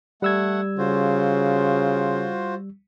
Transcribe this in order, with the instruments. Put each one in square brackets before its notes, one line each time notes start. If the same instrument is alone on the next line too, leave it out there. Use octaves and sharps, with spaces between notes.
[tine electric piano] G3 E6 G#6 [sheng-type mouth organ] A3 F#5
[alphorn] C#3 [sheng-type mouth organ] F4 F#4 C5